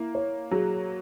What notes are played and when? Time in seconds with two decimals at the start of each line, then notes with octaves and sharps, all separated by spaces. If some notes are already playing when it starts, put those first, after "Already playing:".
Already playing: A#3 E4
0.15 C#5
0.51 F#3 G#4